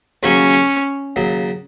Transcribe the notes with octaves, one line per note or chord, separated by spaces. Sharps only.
D#2 C#3 F#3 C#4
D#2 C#3 F#3